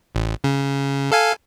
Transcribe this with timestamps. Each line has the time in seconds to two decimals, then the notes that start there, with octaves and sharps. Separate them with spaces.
0.15 A1
0.44 C#3
1.12 A4 F5 G#5